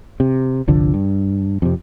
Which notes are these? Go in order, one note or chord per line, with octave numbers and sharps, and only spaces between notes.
C3
G1 C2 D3 F3
G2
F2 C3